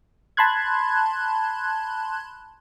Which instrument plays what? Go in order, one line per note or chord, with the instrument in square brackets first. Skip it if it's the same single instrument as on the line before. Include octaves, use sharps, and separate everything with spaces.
[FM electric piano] A5 B5 C6 F#6 G#6